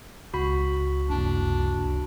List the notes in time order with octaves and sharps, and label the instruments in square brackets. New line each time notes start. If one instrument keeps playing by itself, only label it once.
[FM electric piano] C#2 [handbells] F#4 B5 B6
[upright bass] F#1 C2 [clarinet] D4